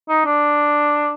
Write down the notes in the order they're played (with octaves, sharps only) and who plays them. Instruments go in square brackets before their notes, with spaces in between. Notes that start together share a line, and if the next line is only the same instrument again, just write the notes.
[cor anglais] D#4
D4